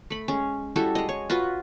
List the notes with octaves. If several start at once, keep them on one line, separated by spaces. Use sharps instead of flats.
A3 B5
G#3 C#4
G3 E4 F#4 A4
G#3 D#5
C#5
F4 F#4 B4